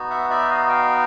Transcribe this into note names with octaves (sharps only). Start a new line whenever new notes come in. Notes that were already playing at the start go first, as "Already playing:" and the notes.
Already playing: B3 D#4 F#4
E5 F#5
D5 E5
D#5 F5
F5 G5